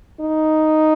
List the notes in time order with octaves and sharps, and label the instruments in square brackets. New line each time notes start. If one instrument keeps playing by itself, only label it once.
[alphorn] D#4